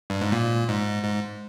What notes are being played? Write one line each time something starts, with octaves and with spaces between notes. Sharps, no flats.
G2
G#2
A#2
G#2
G#2